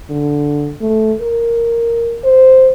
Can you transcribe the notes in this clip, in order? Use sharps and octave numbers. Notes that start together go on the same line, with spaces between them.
D3
A3
A#4
C5